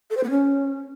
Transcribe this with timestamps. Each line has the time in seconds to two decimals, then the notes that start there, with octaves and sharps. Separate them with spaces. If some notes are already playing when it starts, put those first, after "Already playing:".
0.10 A4
0.17 C5
0.23 B3
0.30 C#4